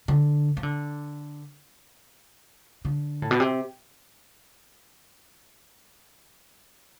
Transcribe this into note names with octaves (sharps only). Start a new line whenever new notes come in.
D3
E3
D3
D3
A2
B2
C3